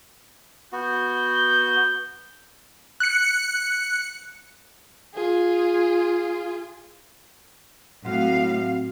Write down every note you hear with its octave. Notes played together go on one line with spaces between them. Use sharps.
B3 F#4 G6
F#6 C#7
F4 G#4
A2 F#3 C4 F#4 F5